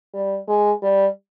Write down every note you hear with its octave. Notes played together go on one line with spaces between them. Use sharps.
G3
G#3
G3